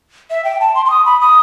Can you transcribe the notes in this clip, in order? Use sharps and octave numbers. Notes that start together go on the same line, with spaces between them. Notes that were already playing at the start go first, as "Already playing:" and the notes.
E5
G5
A5
C6
C6
D#6
B5
D#6